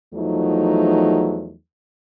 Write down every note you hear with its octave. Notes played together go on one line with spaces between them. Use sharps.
E2 F3 F#3 A3 D#4